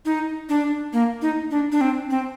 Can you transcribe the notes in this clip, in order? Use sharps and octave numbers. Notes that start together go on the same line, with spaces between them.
D#4
D4
A#3
D#4
D4
D4
C4
C4